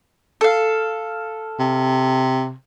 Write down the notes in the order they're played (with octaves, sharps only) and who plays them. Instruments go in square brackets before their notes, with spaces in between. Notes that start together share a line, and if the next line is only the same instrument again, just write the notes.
[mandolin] A4 F5
[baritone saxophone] C3